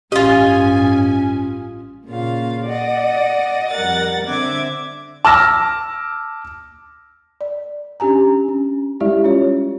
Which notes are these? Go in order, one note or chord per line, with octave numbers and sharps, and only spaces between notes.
A1 G2 C#4 F4 G4 D#5 G#5
A#2 C#3 F4 F5
D5 D#5 F#5
F2 G3 A#4 F#5 A6
D3 C4 E5 D6 G#6
A5 D6 E6 F6 A#6
D5
C#4 D4 G4 G#5 A#5
C#4
G3 G#3 E4 G4 D5 E5
C#4 F4 G4 C#5